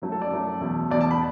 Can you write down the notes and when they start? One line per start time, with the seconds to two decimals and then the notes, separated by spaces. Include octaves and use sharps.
0.02 F#2 F#3 A3
0.12 A4
0.22 D5
0.31 F#2 F#3 A3
0.61 E2 B2 A3
0.90 E2 B2 A3 D5
1.01 A5
1.11 B5